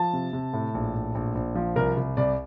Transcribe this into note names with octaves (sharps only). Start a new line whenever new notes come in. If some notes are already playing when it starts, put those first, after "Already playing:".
Already playing: F3 A5
C3
C3
A2
A#1
A2
A#1
A#1
F3
C2 A#4
C2
C2 D5